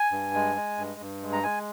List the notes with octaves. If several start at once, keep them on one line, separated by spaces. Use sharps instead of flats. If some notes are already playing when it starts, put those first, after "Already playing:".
Already playing: G#5
G2
G#3
G#3
G2
G2
G#3
A#5
G#3 G#5